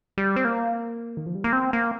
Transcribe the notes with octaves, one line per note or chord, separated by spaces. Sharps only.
G3
C4
A#3
D#3
F3
G3
A#3
C4
A#3